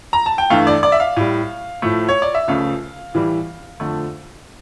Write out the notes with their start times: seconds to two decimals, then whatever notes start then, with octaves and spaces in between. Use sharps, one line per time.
0.13 A#5
0.26 A5
0.38 G5
0.50 G2 E3 A3 F5
0.67 D5
0.83 D5
0.92 E5
1.00 F5
1.17 A2 G3
1.82 A2 F3 A3
2.09 C#5
2.22 D5
2.35 E5
2.48 C#2 C#3 F3 A3 F5
3.14 A2 E3 G3
3.80 F2 D3 F3 A3